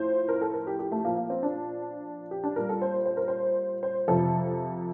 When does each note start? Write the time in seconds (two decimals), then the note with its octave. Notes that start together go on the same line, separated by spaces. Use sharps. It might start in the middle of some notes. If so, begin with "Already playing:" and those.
Already playing: A2 F3 C5
0.29 A#4
0.41 A4
0.54 A#4
0.67 G4
0.79 G4
0.92 A3
1.04 A#2 F3 A#3
1.17 A#3
1.30 C4
1.43 D4
2.31 G4
2.44 D4
2.56 A#2 G3 A#4
2.69 A4
2.82 C5
3.06 C5
3.17 A#4
3.28 C5
3.83 C5
4.08 F2 C3 F3 A4